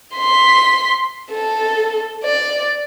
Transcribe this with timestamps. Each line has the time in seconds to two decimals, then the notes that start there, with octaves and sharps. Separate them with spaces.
0.15 C6 B6
1.31 A4
2.24 D5